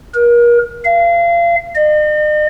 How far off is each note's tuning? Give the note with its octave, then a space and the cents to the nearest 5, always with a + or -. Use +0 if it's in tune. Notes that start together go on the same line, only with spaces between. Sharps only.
A#4 +35
F5 -30
D#5 -45